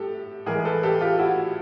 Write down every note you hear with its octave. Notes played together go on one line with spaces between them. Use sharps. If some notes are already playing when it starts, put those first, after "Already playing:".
Already playing: A2 G4 A4
A2 E3 G#3 G#4 A#4
A4 B4
G4 A4
F4 G4
E4 F#4